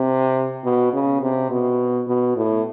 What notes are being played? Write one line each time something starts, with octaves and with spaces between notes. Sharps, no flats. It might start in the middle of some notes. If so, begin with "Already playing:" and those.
Already playing: C3
B2
C#3
C3
B2
B2
A2